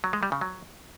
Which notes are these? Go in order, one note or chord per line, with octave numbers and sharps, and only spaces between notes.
F#3
G#3
G3
C#3
F#3